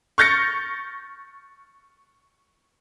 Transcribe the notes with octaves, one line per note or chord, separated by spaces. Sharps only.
C#6 F6 G6 A6 A#6 C#7